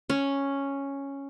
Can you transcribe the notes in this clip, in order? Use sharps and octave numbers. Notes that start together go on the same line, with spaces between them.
C#4